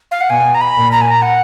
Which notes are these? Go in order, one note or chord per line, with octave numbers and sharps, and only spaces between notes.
F5
F#5
B2 G#5
A#5
B5
A#2
A#5
G#5
A#5
F#5